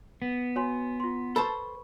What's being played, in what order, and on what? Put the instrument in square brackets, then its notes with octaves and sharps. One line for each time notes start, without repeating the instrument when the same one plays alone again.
[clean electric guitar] B3
[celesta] F#4 G#5 C6 [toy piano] C#5
[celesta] F4 C6
[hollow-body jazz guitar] A4 C5 A5 [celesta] B4 C#6 [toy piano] B5